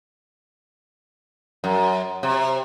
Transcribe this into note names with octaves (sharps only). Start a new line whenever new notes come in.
F#2
C3